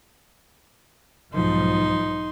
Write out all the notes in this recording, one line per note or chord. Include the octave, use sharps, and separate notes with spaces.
B1 G#2 F3 D#4 C6